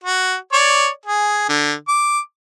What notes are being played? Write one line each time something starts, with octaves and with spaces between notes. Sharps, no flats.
F#4
C#5 D5
G#4
D3
D6